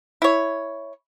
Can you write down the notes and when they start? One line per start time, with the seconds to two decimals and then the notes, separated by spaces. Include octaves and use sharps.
0.22 E4 C#5